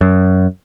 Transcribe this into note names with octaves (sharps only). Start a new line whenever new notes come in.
F#2